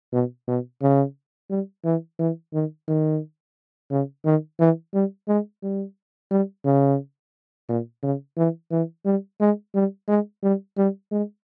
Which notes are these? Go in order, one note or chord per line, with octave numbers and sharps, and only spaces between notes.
B2
B2
C#3
G3
E3
E3
D#3
D#3
C#3
D#3
E3
G3
G#3
G3
G3
C#3
A#2
C#3
E3
E3
G3
G#3
G3
G#3
G3
G3
G#3